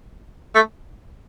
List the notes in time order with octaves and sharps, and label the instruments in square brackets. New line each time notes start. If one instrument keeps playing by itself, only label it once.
[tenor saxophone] A3